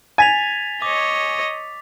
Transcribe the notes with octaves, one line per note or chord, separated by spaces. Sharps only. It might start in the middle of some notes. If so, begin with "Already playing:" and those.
G#5 A6 B6 F7
C#5 D#5 D6